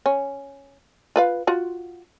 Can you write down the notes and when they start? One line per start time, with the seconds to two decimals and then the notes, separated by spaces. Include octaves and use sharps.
0.06 C#4
1.16 F4 B4 F5
1.47 F4 F#4